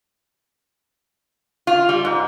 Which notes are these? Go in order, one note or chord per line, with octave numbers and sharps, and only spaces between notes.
F4
G3
G#2